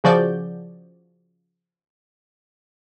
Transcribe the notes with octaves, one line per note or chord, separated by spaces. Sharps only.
C#3 F3 F#4 G#4 D5 G6